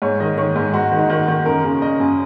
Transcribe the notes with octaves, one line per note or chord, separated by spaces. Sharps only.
G#2 C#5
D#3 D#5
D#3 C#5
G#2
G#2 F#4
D#3
D#4
D#3 F#4
D#3
F#2 A#4
C#3
C#3 D#5
F#2